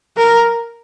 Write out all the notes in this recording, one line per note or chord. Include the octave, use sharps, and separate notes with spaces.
A#4